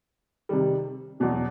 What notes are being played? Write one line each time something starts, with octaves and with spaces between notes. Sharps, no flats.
C3 D#3 G3
E2 B2 F#3